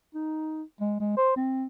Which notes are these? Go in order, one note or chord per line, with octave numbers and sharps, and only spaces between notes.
D#4
G#3
G#3
C5
C4